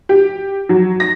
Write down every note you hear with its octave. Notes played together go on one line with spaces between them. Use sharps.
G4
F#3
A#6